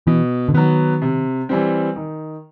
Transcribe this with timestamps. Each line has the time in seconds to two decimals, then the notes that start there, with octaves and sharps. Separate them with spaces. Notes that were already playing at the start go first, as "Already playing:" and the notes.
0.07 B2 E3
0.49 D3
0.54 D#3 F#3 B3
1.02 C3
1.49 E3 G3 C4
1.96 D#3